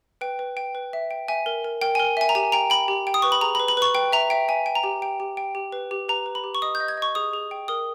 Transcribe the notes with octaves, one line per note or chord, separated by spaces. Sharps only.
B4 G5
B4
G5
B4
E5
G5
E5 G#5
A#4
A#4
A#4 G5
G#5
A#4
E5 G#5
A#5
G4 G#5
G5 A#5
G5 B5
G4
G5
D#6
B4 C#6
B5
G#4 A#5
B5
B4
B5
B4 C#6
B4 G5
E5 A#5
E5 G5
E5 G#5
G5
A#5
G4
G5
G4
G5
G4
B4
G4
B4 A#5
B4
B5
G4
C#6
D#5 D#6
G6
D#5
G#6
D#5 C#6
G#4 D#6
G#4
G5
A#4 D#6